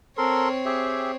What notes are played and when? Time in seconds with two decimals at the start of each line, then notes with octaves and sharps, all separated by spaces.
0.18 C4 A4 A#4 C#5 C6
0.66 G4 G#4 E5